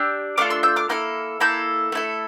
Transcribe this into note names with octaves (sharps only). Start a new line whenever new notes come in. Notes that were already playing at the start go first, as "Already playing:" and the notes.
Already playing: D4 G4 E6 G6
A3 D4 F4 A4 D6 F6
C6 E6
E6 G6
D6 F6
A#3 E4 A4 F6
A#3 E4 A4 E6 G6
A3 E4 A4